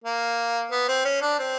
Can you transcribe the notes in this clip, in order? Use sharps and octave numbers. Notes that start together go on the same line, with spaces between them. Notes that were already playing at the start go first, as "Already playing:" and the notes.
A#3
B3
C4
C#4
D4
C4